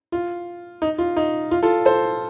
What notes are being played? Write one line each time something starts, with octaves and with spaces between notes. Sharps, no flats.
F4
D#4
F4
D#4
F4
F4 A4
A4 C5